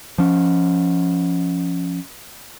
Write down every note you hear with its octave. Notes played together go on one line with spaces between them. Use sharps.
F3 C#4